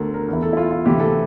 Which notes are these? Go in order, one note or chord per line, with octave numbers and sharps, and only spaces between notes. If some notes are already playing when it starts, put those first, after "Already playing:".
Already playing: D2 D3 A4 A#4
A#4
E2 E3 A#4
A4
E4
F4
F4
D2 C3 E3 G4
A4